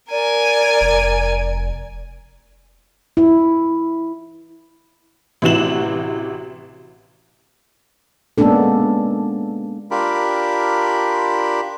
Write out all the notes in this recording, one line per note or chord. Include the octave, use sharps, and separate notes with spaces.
A#4 D5 G#5
F1
E4
A1 C3 E3 F#4 E7 F#7
G#3 A#3 B3 C#4 D4 A4
D4 F4 G4 A#4 B5